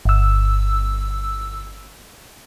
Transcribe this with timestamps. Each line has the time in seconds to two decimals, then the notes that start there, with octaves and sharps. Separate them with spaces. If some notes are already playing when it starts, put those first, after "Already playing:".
0.05 G1 E6